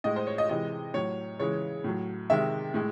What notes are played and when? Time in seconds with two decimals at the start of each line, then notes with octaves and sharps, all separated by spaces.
0.04 A2 G#3 D#5
0.16 C5
0.27 C#5
0.38 D#5
0.49 C3 E3 G#3 D#5
0.94 A2 F#3 C#5
1.39 C#3 E3 G#3 C#5
1.84 A2 F#3
2.30 C3 D#3 G#3 E5
2.74 A2 G#3